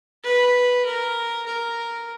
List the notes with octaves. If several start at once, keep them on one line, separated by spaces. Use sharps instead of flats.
B4
A#4
A#4